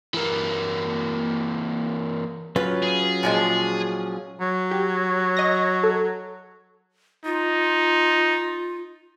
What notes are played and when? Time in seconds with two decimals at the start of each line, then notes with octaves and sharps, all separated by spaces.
0.14 E3 A#3
2.56 F#3 C#4 F4 B4
2.83 G#4
3.23 A#2 F3 G#3
4.41 F#3
4.71 G4
5.37 D#5 A#6
5.84 A4
7.25 D#4 F4